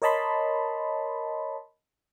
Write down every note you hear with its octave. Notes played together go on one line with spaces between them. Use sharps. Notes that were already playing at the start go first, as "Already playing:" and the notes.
A#4 C#5 D#5 A5 B5 C6